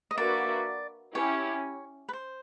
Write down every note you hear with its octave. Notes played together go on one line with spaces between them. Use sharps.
D#5
A#3 D4 F#4 B4 D5 E5
C#4 E4 G4 C#5
B4
C5